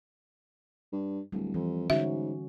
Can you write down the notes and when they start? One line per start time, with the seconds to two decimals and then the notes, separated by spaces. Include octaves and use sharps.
0.92 G2
1.32 D1 G3
1.54 F2 E3
1.90 G#2 D3 C#4 F#4 E5